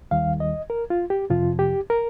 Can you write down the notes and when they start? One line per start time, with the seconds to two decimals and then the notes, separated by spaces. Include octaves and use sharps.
0.11 D#2 D#3 G3 F5
0.40 D#5
0.70 A#4
0.90 F4
1.10 G4
1.30 F2 C3 F3 F4
1.59 G4
1.90 A#4